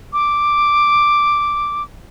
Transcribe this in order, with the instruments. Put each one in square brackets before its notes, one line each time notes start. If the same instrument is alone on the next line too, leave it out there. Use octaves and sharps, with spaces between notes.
[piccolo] D6